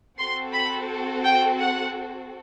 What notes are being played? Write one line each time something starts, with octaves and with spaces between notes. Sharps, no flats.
C4 F#4 A4 C6
B5
G5
F#5